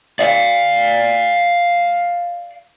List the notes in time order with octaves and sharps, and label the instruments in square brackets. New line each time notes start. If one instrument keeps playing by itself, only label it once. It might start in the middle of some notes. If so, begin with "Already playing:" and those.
[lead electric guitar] D5 F5